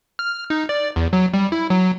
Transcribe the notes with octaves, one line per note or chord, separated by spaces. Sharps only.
F6
D#4
D5
E2
F#3
G3
E4
F#3